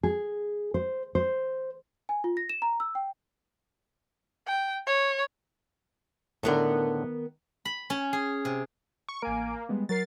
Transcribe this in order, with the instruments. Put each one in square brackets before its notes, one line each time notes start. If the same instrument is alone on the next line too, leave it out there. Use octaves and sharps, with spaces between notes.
[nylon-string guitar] G#4
C5
C5
[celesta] G#5
F4
A#6
E7
A#5
E6
G5
[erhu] G5
C#5
[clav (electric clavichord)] A2 D3 [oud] D#3 B3 A#4
[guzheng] B5
C#4
G#4
C3
[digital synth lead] C#6
[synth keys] A1 G#5 D7 [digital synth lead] A#3
[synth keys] G3 G#3 B3
[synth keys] F#3 A#4 C7 [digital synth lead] A6